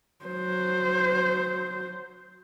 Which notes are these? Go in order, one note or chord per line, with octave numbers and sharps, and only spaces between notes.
F#3 C5